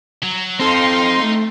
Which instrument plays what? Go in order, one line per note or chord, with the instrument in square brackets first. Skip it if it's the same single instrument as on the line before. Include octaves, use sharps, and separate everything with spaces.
[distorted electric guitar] F#3
[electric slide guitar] C4 A4 [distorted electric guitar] D#4 [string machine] F5 G5 [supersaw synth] C6
[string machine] A3